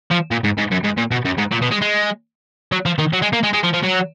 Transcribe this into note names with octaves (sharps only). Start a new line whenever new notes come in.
F3
A#2
G#2
G#2
F#2
G#2
A#2
B2
F#2
G#2
A#2
B2
G#3
G#3
F#3
F3
D#3
F#3
G#3
A#3
G#3
G#3
F3
F3
F#3